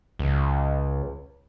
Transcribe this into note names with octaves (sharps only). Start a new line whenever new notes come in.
C#2